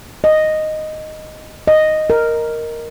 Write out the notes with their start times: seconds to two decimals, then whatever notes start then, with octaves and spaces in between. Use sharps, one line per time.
0.24 D#5
1.68 D#5
2.10 A#4